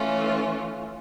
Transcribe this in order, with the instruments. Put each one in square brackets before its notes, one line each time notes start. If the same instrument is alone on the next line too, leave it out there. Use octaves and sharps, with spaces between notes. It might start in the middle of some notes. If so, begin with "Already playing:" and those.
Already playing: [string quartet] E3 A3 C#4 F4